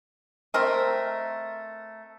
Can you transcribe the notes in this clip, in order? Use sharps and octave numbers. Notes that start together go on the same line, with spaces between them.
A3 C4 A#4 D#5